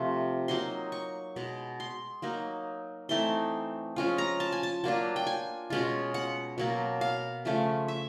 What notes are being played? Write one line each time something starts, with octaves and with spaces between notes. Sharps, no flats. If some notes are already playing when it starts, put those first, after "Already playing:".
Already playing: C3 F3 A3 C4
F#3 A#3 D#4 C6
C#6
B2 G#3 B3
C6
F#3 A#3 D#4
E3 A3 C4 D#4 C6
F3 G#3 C#4 F4
A#5
A5
G#5
A5
F#3 A#3 D4 F4
G5
G#5
B2 G#3 C#4 F4
F#5
B2 F#3 A#3
F5
C#3 F3 A3 C#4
E5